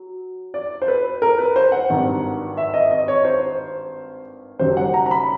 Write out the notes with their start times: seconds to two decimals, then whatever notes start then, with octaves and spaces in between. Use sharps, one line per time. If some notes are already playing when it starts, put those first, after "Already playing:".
Already playing: F#3
0.54 D5
0.82 C5
0.88 B4
1.22 A#4
1.38 B4
1.56 C5
1.72 F#5
1.90 G#1 G2 D#3
2.57 E5
2.74 D#5
2.91 D#5
3.08 C#5
3.25 C5
4.59 F#1 F#2 D#3 G3 C5
4.77 F#5
4.94 A#5
5.06 A#5
5.11 B5